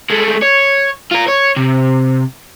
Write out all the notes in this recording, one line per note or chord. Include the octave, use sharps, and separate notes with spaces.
G#3 A3
C#5
F4 A#4
C#5
C3